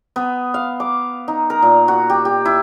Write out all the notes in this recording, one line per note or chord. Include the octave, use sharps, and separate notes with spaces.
B3
F5
D6
D#4
A#4
A#2
F#4
G4
G4
E4